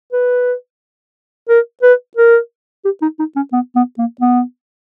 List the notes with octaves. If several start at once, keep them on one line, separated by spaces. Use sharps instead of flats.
B4
A#4
B4
A#4
G4
D#4
D#4
C#4
B3
B3
A#3
B3